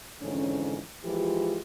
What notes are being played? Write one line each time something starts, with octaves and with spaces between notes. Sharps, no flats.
F2 G#2 D3 E3 C#4
E3 F3 G#3 F4 G4